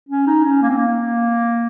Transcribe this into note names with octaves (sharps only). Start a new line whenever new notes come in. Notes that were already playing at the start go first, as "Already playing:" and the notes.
C#4
D#4
C#4
A#3
C4
A#3